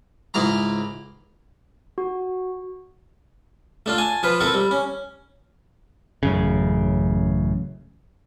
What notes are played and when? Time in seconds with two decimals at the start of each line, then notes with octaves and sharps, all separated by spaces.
0.34 C#2 G#2 E4 F5 A#5
1.98 F#4
3.86 A3 D4 F4
3.98 G#5 A5
4.23 F3 F4 B4
4.41 C4 E4 A4 A#4
4.54 G3
4.71 C#4
6.23 A1 F#2 C#3